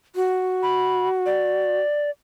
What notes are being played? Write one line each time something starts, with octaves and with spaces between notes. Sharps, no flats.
F#4
B5
D5